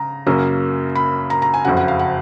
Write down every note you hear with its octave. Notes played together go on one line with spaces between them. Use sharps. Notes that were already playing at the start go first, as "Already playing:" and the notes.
Already playing: C#3 A#5
F#2 C#3 F#3 A#3 C#4
B5
A#5
A#5
G#5
F#1 F2 C#3 F#3 F#5
F#5
F5
F#5